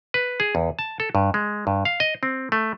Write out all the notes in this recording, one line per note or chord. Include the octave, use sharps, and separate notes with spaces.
B4
G#4
E2
A5
A4
G2
G#3
G2
F5
D#5
C4
A3